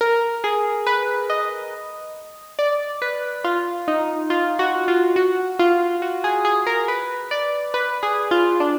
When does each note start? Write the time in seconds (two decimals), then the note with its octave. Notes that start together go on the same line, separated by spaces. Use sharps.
0.01 A#4
0.44 G#4
0.87 B4
1.30 D#5
2.59 D5
3.02 B4
3.44 F4
3.88 D#4
4.30 F4
4.59 F#4
4.88 F4
5.16 F#4
5.59 F4
6.02 F#4
6.24 G#4
6.45 G#4
6.67 A#4
6.88 B4
7.31 D5
7.74 B4
8.03 G#4
8.31 F4
8.60 D4